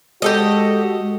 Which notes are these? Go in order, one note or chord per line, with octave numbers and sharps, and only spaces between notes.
G#3 F#4 G4 A4 D#5